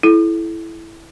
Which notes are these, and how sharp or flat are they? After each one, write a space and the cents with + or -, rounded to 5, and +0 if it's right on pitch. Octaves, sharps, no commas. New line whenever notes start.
E4 +0 A4 -35